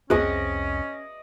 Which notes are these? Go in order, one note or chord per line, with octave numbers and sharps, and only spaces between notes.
C2 F2 C4 C#4 G#4 D5 D#5 C#6